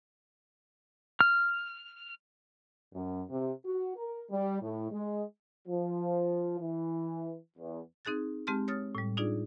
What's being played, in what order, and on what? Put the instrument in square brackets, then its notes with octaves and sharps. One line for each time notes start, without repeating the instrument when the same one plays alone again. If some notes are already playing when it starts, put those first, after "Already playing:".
[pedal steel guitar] F6
[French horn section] F#2
C3
F#4
A#4
G3
A2
G#3
[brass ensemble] F3
E3
E2
[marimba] C4 D#4 G#4 F#6 A6
G#3 C4 G4 A5 C6 F6
C#5 D#6 F6 A6
A2 G3
D4 D#4 F4 G#4 D5